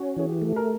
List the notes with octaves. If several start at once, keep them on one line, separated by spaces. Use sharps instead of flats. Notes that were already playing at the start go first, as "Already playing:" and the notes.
Already playing: C#4 F#4
E3 G#4
G4
A3
A#4